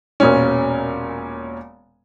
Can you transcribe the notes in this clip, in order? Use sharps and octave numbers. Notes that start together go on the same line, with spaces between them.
E1 A#2 C#4